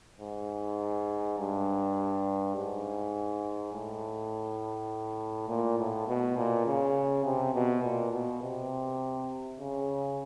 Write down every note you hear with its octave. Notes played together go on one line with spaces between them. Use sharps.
G#2
G2
G#2
A2
A#2
A2
B2
A#2
C#3
C3
B2
A#2
B2
C3
C#3